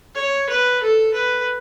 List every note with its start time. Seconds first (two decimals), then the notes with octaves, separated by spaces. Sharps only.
0.15 C#5
0.50 B4
0.83 A4
1.14 B4